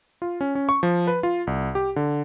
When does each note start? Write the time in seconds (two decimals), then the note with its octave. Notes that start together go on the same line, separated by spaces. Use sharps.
0.22 F4
0.41 C#4
0.55 C#4
0.69 C#6
0.83 F3
1.07 B4
1.23 F4
1.47 C2
1.75 G4
1.96 D3